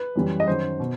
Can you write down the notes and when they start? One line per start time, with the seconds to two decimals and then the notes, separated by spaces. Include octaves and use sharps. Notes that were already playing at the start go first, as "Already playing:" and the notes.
Already playing: B4
0.15 F#2 E3 G3
0.40 D#5
0.47 F#2 D#3 F#3 C5
0.80 B2